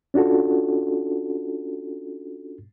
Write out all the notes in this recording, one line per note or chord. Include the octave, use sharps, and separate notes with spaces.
C#4 D4 F4 F#4 A4